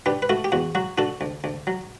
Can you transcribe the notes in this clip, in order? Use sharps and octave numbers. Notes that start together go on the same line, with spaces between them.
D3 G4 B4
B4
A3 F#4 A4
G4
E2 F#4
F#3 F#4
D3 F#4 A4
D2
D2
F#3